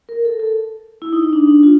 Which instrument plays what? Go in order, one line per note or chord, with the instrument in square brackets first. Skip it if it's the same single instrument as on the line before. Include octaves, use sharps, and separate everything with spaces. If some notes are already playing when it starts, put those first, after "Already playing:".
[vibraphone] A#4
A4
A4
E4
D#4
D#4
D4
D#4
D4
F4